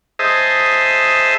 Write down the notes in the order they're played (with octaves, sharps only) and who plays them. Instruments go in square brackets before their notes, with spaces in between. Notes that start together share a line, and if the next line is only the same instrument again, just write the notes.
[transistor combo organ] G#4 C5 D#5 E5 A5